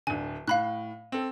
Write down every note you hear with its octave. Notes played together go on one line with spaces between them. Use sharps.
D1 D3 G#5
A2 F5 B5 F#6
C4 A4